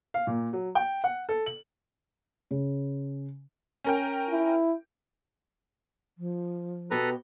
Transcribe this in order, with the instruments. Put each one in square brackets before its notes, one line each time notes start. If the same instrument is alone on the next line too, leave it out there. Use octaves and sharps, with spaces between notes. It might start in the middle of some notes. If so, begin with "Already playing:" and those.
[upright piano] F5
A#2
F#3
G5
F#5
A4
F#7
[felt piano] C#3
[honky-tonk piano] C#4 A#4 G5
[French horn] E4
[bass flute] F3
[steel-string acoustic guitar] B2 G4 [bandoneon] A4 B4 A#5